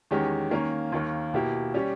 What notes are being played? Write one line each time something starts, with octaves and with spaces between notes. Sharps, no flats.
E2 D#3 G#3 C#4 G4
D#3 A#3 C#4
D#2 D#3 A#3
B2 A#3 E4 G4
G3 C#4 G4